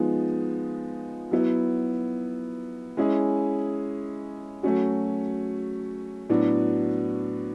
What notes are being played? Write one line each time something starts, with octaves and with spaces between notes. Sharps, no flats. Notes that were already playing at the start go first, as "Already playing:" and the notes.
Already playing: F3 G#3 B3 D#4
F#3 B3 E4
G#3 C#4 E4 G#4
F#3 A3 C#4 F#4
A2 F#3 B3 D4 F#4